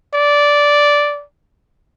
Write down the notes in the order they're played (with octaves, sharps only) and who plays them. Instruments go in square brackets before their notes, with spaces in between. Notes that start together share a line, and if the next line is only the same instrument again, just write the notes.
[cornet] D5